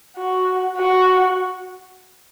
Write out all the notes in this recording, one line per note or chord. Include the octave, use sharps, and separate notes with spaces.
F#4
F#4